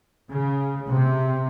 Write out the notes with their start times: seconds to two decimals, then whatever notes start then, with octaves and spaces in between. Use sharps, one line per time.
0.29 C#3
0.90 C3